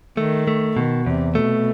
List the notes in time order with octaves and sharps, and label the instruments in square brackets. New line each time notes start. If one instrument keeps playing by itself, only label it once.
[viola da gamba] D#3 [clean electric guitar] A3
[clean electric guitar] A3
[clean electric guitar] B2 [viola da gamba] D#3
[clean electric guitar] E2 [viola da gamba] C3
[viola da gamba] B2 [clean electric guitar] A3